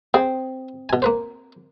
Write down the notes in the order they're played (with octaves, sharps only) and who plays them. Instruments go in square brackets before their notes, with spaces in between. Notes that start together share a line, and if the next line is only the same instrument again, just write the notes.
[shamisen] C4 [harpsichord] G#4
[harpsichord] B2 G#5
A#3 B4 C5